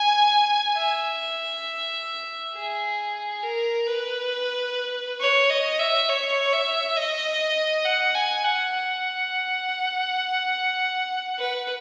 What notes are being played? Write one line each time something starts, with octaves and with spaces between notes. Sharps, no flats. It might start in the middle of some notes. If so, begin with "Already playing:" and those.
Already playing: G#5
E5
G#4
A#4
B4
C#5
D#5
E5
C#5
E5
D#5
F#5
G#5
F#5
F#5
B4